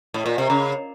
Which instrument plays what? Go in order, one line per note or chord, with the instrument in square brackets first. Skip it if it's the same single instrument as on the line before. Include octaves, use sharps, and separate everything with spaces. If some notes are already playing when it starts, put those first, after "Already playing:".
[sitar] A2
A#2
C3
C#3